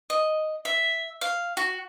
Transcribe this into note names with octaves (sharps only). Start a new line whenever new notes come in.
D#5
E5
F5
F#4